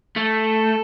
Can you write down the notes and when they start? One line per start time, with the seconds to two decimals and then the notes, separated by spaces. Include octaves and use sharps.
0.16 A3 A4